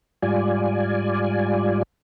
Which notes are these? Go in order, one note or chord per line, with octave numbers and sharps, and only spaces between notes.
G#2 G3 F4 D5 G#5